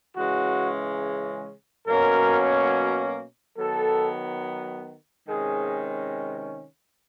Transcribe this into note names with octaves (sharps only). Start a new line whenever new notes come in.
C#3 E3 G#3 C#4 F#4
B2 F#3 A#3 C#4 A#4
D#3 F#3 B3 A4
C3 D#3 G#3 C#4 G#4